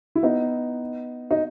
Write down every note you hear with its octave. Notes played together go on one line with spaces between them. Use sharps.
E4
B3 D#4
D#4